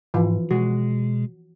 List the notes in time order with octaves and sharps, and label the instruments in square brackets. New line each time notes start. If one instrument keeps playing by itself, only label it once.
[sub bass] G#2 [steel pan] E3 F3
[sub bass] B2 [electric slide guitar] G#3 [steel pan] F#4